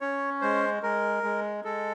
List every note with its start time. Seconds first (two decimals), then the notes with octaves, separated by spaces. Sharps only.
0.01 C#4 C#5
0.41 G#3 C5
0.83 G#3 A#4
1.23 G#3
1.64 G#3 A4